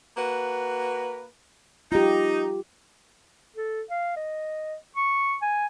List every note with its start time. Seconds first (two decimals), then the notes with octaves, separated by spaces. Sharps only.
0.18 A#3 F#4 B4
1.92 D#4 F4 G4
3.56 A4
3.90 F5
4.16 D#5
4.96 C#6
5.42 G#5